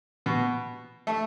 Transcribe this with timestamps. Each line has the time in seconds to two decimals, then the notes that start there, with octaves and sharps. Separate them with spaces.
0.26 B2
1.07 A3